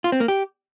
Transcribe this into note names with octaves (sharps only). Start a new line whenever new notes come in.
F4
C4
A#3
G4